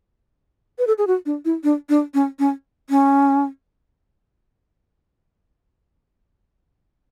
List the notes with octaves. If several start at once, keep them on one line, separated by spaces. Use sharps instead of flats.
B4
A4
G#4
F#4
D4
E4
D4
D4
C#4
C#4
C#4